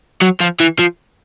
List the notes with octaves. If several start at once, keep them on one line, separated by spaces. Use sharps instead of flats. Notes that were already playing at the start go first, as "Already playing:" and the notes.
F#3
F3
E3
F3